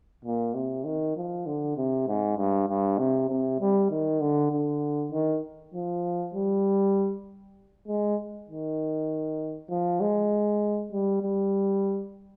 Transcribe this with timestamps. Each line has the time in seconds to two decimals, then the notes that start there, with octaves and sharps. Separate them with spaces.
0.25 A#2
0.54 C3
0.85 D#3
1.16 F3
1.46 D3
1.77 C3
2.08 G#2
2.37 G2
2.68 G2
2.98 C3
3.29 C3
3.60 G3
3.91 D#3
4.20 D3
4.52 D3
5.12 D#3
5.74 F3
6.34 G3
7.88 G#3
8.48 D#3
9.71 F3
10.01 G#3
10.92 G3
11.23 G3